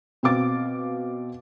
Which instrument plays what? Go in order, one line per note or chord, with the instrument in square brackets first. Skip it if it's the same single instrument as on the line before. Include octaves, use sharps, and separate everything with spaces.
[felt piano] B2 C4 F5 D6 A6